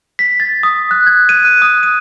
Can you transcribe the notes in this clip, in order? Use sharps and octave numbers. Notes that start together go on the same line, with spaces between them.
B6
A6
D#6
F#6
G#6
D#7
F#6
D#6
D#7